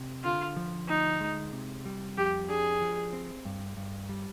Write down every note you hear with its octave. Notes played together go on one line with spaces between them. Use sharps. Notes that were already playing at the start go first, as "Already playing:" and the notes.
Already playing: C3
D3 F4
F3
D2 D#4
G#3
C3
G3
F2 G4
D4 G#4
F3
C4
G2
G2
G3